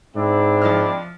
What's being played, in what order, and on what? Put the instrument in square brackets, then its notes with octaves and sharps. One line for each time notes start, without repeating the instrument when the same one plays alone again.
[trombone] G#2 [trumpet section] C4 D4 E4
[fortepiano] F3 D#5 F6